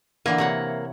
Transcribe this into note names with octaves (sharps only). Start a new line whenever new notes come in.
D3 E3 A#3
C3 C#5 F#5